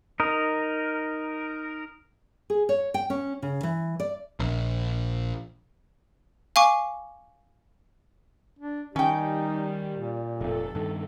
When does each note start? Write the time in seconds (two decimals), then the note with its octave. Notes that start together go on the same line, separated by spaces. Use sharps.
0.20 D#4 A#4
2.50 G#4
2.69 C#5
2.94 G5
3.10 C#4
3.42 C#3
3.63 E3
4.00 D5
4.40 A#1
6.56 F5 G#5 C#6 D6
8.59 D4
8.96 D#3 G3 C#4 D#4 G5
9.93 A#2
10.41 F1 C3 A4
10.75 G2 D#3